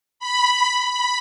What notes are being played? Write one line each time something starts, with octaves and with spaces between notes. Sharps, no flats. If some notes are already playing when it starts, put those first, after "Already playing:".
B5
B5